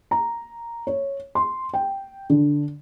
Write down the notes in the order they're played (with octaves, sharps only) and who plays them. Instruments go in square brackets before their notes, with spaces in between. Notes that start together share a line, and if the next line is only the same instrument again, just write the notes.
[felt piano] A#5
C#5
C6
G5
D3